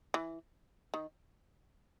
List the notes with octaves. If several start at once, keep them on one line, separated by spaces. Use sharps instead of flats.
E3
D#3